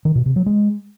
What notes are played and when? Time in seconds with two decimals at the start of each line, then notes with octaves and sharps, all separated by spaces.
0.05 D#3
0.15 B2
0.26 C3
0.36 F#3
0.46 G#3